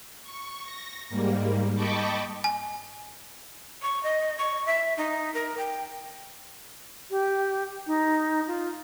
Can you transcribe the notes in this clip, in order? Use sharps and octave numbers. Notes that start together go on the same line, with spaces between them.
C#6
A#6
G#2 G3 A#3
D#5 G5 A5 B5 C#6 D6
G#5
C#6
D#5
C#6
E5
D#4
A#4
G5
G4
D#4
F4